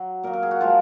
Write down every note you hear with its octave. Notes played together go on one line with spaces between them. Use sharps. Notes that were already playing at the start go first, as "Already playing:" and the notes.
Already playing: F#3
A#2 F#3 A#4
A#4
G#4
F#4
F3 G#3 F4